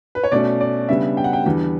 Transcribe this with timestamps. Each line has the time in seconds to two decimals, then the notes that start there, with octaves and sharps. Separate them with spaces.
0.15 B4
0.23 C#5
0.32 B2 A3 C#4 D5
0.61 D5
0.89 C#3 G3 B3 D4 E5
1.17 G5
1.24 F#5
1.33 G5
1.45 E2 D3 G3 B3 D4